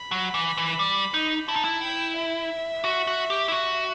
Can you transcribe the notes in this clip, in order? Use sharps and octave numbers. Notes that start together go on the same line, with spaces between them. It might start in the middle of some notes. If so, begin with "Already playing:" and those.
Already playing: B5
F#3
E3
E3
G3
D#4
E4 A5
D#4
E4
G5
E5
F#4
F#4
G4
E4
F#4